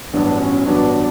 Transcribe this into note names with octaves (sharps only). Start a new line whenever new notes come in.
A1 G2 F#3 B3 D4 F#4
C#4
A1 G2 F#3 B3 D4 F#4
D4